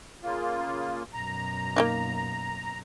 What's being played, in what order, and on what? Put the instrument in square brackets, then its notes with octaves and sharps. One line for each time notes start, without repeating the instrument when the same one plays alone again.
[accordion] C#3 A#3 F4
[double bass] F#2 B2 [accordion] A#5
[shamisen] A#3 D4 D#4